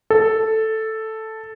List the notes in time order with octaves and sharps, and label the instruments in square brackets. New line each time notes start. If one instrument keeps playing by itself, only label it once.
[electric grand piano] A4